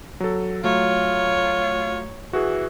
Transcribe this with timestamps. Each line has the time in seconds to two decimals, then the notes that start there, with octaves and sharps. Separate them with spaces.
0.20 F#3 A4
0.64 F#3 A3 F4 C#5
2.33 E3 F#4 G#4